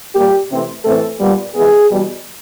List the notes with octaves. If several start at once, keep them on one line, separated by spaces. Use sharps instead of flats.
A#2 G3 A#3 G4
C3 E3 A3 C4
A2 E3 A3 C4 A4
A#2 G3 B3
C3 E3 G#3 B3 G#4
E2 B2 G3